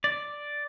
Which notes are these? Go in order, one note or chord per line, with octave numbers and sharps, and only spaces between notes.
D5